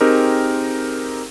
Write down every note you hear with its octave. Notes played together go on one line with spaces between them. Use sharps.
C4 D#4 G4 G#4 A#4